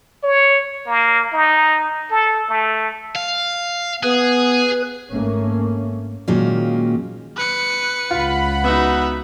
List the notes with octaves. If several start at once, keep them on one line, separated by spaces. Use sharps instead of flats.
C#5
A#3
D#4
A4
A3
F5
B3 G#4 B4
G#1 A3 A#3 C#4
A#2 D#3 F#3 G#3 A#3 C#4
B4 C#7
C#2 F4 F#5 B5
B3 D#4 F#4 E5